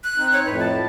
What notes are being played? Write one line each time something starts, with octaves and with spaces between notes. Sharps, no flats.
F#6
C4 D#4
C#5
F2 A2 B4
A5